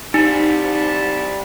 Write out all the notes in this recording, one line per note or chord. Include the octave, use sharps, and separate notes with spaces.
G3 C4 D#4 A5